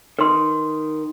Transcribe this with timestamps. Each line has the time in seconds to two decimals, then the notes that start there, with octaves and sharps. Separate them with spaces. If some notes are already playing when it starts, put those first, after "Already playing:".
0.19 D#3 B4 C6